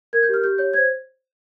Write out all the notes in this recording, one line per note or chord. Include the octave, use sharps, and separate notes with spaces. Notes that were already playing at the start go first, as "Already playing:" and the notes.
A#4 G#6
G6
G4 F6
G4 G6
C#5 G6
C5 G#6